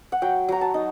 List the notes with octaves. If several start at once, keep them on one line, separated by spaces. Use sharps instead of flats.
F#5
F#3 G5
F#3 A#5
A5
D#4